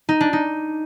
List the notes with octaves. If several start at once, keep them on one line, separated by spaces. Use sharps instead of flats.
D#4
D4
D#4